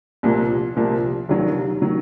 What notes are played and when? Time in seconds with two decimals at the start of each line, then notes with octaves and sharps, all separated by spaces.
0.23 C2 A#2 F3 A#3
0.76 C2 A#2 F3 A#3
1.29 F1 D#2 D#3 F#3
1.82 D#3 F#3